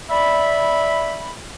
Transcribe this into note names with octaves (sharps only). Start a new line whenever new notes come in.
D5 E5 B5